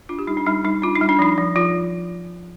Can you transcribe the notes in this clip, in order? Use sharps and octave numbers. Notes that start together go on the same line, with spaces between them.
D4 F4
G4
G3 D#4
D4
G3 D#4
G3 D#4
D4 F4
D#4
G3
D4
F3 D#4
F3
F3 F4